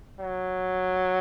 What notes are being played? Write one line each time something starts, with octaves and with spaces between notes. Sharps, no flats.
F#3